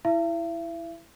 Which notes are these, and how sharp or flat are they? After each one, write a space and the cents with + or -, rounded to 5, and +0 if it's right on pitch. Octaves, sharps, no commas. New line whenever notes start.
E4 +0 E5 +40